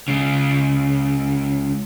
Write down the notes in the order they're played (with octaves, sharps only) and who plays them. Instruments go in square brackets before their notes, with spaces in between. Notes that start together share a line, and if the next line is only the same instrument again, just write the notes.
[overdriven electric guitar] C#2 C#3